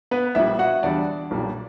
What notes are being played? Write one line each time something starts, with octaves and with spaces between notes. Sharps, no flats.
B3 B4
A#1 A#2 G3 E4 E5
F#4 F#5
E2 D3 G3 D4 D5
B1 A#2 G3